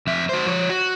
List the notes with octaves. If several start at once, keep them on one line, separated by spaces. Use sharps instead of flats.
F2 E5
F#4 C5
F3 C#5
F#4